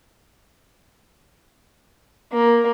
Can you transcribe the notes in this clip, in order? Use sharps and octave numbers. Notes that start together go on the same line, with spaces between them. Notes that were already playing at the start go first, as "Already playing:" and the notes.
A#3